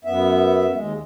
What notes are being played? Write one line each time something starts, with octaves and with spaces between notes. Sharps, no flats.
F#2 B3 E5
D#2 G#3